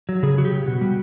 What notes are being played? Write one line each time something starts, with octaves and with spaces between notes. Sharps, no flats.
F#3
C#3 G#4
F#3 F#4
G4
C#3
B2 F#4
G3